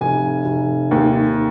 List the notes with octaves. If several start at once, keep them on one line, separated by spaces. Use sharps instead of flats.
F1 G#5
F1
D#2